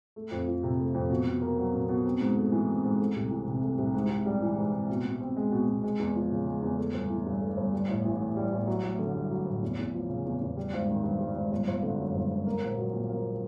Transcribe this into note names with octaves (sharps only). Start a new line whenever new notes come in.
A3
F2
F3
C3
A3
F2
B2
B2
A#3
F#3
B2
B2
C4
G#2
A3
E3
C4
G#2
A3
C2
E3
C3
A3
C2
G#2
G#2
G3
E3
G#2
G#2
B2
B2
C4
G#3
B2
B2
G#3
E2
F3
C#3
G#3
E2
A3
G1
E3
G2
A3
G1
G3
A1
E3
A2
G3
A1
F#3
A1
D3
G2
F#3
A1
E2
E2
F3
C#3
E2
E2
G3
G#1
D#3
G2
G3
G#1
G1
G1
D3
F#2
G1
G1
A#3
A#1
F#3
A#2
A#3